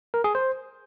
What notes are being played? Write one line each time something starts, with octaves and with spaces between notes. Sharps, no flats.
A#4
G#4
C5